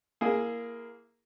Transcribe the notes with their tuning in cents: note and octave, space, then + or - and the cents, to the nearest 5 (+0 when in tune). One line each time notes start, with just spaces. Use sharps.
A#3 +0 E4 +30 G#4 +0